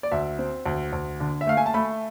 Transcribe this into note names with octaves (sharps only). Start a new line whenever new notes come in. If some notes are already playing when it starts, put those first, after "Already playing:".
D5
D2 E5
C4
D2
D2
D3
E5
A3 F5
G#5
A5
A3 B5